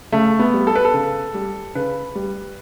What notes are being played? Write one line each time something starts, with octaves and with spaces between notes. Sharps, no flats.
C#3 A3
B3
G3
A4
B4
A4
C#3
G3
C#3 B4
G3